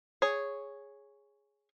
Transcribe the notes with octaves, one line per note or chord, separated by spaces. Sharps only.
G#4 C#5